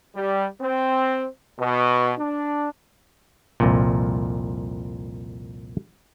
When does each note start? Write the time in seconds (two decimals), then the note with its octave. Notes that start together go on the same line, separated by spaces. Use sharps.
0.15 G3
0.61 C4
1.59 B2
2.19 D4
3.60 C2 F2 A#2